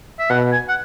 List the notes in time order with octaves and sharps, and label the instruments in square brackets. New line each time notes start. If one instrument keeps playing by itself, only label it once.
[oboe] E5
[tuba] B2 [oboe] F#5
[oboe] G#5
F#5